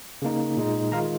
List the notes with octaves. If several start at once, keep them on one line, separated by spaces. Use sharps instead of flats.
C#3 A#3 D#4
A#2 G#3 D#4
D#3 G#3 F4 F5 A#5